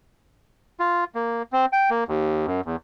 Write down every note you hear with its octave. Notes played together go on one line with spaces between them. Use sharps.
F4
A#3
C4
G5
A#3
D#2
F#2
E2